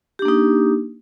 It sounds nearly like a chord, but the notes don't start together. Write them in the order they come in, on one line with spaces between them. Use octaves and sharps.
G4 D4 A#3 D#4